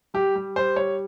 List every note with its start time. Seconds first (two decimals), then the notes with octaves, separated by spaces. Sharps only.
0.14 G3 G4
0.35 G3
0.56 G3 C5
0.76 G3 C#5